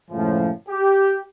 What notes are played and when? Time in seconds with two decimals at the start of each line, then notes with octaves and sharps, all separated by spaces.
0.10 C#2 F#2 A2 F3
0.69 G4